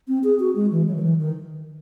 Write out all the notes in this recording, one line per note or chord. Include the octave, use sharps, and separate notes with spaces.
C4
G#4
F#4
G#3
E3
F#3
D#3
E3
D#3